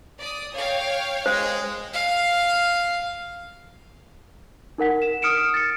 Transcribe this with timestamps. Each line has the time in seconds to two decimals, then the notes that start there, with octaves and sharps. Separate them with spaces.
0.19 D5 D#6
0.55 C#5 F5 G5
1.26 G#3 C5
1.94 F5
4.78 D#4 A#4 F#5 B6
5.02 E7
5.22 D#6 F6 C#7 D7 E7
5.54 A6 C#7